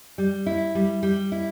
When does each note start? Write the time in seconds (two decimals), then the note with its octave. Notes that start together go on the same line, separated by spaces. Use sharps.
0.18 G3
0.46 E4
0.75 G3
1.03 G3
1.32 E4